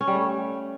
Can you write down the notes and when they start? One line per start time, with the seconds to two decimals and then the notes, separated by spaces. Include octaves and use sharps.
0.01 C#4
0.08 G3
0.14 A3